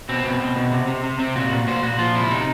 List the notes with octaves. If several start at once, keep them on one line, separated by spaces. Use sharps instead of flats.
B2 C4
B2
B2
B2
C3
C3
C3
C3 C4
A#2 F#4
A#2
A#2 C5
A#2 F#4
F3 F4
C3 E4
C3 D#4